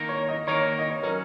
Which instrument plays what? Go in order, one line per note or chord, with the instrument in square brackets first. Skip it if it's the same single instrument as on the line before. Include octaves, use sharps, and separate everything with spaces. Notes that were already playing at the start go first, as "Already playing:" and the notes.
Already playing: [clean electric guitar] D#3 A#3 D#4 A#4
[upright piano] C#5
D#5
[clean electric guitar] D#3 A#3 D#4 A#4 [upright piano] C#5
[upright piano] D#5
C#5
[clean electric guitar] F#3 C#4 [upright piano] A#4